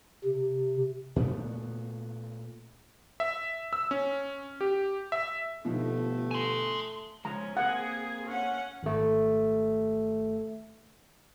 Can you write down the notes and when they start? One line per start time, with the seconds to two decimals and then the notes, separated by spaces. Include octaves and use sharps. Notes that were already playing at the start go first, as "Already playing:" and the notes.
0.24 C3
1.16 A#2 C#3 A3 B3
3.20 E5
3.73 E6
3.91 C#4
4.61 G4
5.12 E5
5.65 G1 B2 F3 A3 D#4
6.31 G#5 C6
7.25 C#3 F3 G#3 C#4 A#5
7.57 A#3 C4 G#4 F#5
8.27 C#4 F#5
8.83 G#1 A3